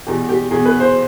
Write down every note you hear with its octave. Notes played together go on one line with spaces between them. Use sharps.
E2 B2 G4
G4
E2 B2 G#4
B4
C5